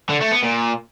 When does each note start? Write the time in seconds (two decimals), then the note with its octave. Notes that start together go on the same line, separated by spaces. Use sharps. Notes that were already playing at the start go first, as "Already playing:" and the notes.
0.09 D3
0.20 A3
0.32 B3
0.43 A#2